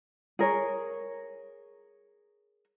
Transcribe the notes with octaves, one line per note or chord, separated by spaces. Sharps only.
G#4 A#4 C#5